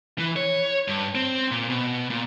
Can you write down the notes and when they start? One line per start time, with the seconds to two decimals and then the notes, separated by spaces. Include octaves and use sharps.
0.18 E3
0.36 C#5
0.88 G2
1.15 C4
1.51 A#2
1.70 B2
2.10 A#2